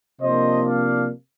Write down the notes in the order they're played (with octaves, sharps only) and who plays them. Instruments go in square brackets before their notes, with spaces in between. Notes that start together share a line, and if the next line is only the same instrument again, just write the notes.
[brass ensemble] C3 F3 A#3 D4 C5 D#5
D5 F5